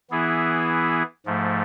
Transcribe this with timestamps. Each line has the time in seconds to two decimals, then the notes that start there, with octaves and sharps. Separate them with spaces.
0.10 E3 B3 E4 G#4
1.26 G#2 F3 A3